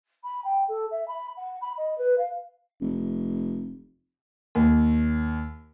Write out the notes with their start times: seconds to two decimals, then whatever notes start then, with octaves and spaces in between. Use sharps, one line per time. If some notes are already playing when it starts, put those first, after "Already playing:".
0.24 B5
0.44 G5
0.68 A4
0.91 E5
1.08 B5
1.37 F#5
1.61 B5
1.77 D#5
1.98 B4
2.18 F5
2.81 F1
4.55 D#2